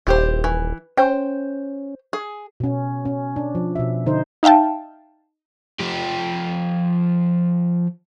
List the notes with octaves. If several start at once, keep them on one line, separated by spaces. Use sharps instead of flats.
D#1 E4 G4 C5
E3
C#4 C5 G5
G#4
B2 C#4
C#4
D4
F3
B2 E5
D3 D#4 C5
D#4 E5 F5 G5 A5
F3 G4